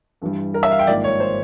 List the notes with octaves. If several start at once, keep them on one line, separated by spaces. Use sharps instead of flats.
G2 E3 G3
A#4
E5
F5
G5
G#1 G#2 F3 A#3 D5
C#5
C5